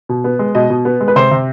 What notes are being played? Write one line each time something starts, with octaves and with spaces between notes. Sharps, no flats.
B2
B3
G#3
B2 D#5
B2
B3
G#3
B4
C3 C5
C3